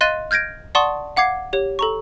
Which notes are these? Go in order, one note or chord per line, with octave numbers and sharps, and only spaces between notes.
D#5 F5 C6 F#6 A6 D#7
F6 G6 G#6 A#6 D7
D5 F#5 A5 C6 C#6 D#6
F5 F#5 D6 G#6 C7
G4 C#5
A4 A#5 C#6